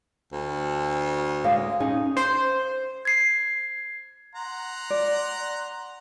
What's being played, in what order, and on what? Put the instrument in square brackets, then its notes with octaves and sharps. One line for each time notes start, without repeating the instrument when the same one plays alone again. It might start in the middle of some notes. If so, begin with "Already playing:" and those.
[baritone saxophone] D2
[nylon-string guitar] G#3 D5 F5
C#4 D#4 G#4
[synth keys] C5
[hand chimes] G#6 C7
[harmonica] F#5 A#5 C6
[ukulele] D5